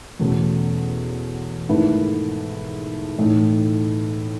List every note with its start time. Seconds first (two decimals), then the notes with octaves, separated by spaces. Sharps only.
0.20 E2 B2 A3 C#4
1.69 G#2 D#3 A3 E4 B4
3.18 A2 E3 A3 D#4